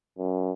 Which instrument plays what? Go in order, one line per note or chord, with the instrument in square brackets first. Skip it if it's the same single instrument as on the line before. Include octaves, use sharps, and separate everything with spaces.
[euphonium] F#2